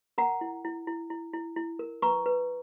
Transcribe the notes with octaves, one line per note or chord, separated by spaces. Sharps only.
A#4 F#5 A#5
E4
E4
E4
E4
E4
E4
A#4
B4 A#5 C#6
B4